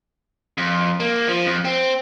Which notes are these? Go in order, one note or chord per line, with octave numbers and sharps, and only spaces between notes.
F2
A#3
F3
F2
C4